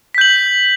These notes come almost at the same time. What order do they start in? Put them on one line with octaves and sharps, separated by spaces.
B6 G6 F#7